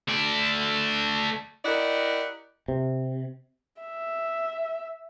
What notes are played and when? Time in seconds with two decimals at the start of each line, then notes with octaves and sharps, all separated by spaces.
0.08 A3 D5
1.64 E4 G4 A#4 D5 D#5 F#5
2.68 C3
3.81 E5